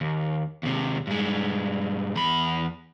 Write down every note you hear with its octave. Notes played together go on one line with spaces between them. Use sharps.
D#2
D#2 C3
G2 G#3
E2 B5